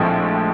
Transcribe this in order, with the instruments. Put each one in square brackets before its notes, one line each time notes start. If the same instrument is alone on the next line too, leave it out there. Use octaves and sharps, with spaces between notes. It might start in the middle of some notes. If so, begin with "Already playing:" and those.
Already playing: [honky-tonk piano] A#1 A2 F3 G#3 C4